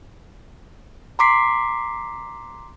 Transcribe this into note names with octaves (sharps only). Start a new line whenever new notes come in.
A#5 C6 D6 B6 C7